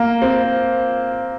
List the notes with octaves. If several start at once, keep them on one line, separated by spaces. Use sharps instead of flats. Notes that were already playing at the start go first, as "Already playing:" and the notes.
Already playing: A#3
C4